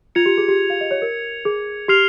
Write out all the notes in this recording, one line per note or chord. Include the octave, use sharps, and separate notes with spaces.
F4 G#6 C#7 F7
G4
G#4
G4
F5
D#5
C#5
A#4
G#4
G4 F6 C7 F7